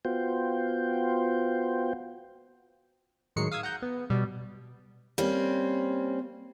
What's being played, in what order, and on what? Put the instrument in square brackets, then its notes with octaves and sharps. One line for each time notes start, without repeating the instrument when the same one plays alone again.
[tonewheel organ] B3 F4 F#4 C5 G5
[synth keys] A2 D#3 F#3 G#3 C7 C#7
F5 D#6 E6 G#6
F#5 A#5 G6
B3
B2 G3
[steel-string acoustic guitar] G3 A#3 C4 C#4